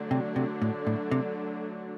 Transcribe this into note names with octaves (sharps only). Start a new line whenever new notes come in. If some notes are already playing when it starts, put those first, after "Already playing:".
Already playing: D3 F#3 A3 D4
C3
C3
A2
A2
C3